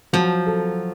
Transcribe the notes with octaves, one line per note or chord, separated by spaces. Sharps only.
F3 F#3
A4